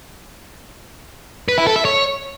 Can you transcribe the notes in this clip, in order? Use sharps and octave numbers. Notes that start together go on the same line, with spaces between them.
B4
E4
A4
E5
C#5